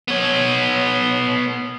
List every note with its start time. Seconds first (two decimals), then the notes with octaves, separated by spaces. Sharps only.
0.08 B3 C#5